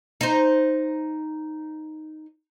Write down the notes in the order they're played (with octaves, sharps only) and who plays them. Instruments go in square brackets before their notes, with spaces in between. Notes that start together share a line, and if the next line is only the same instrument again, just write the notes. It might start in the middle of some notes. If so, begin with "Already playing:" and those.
[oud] D#4 C5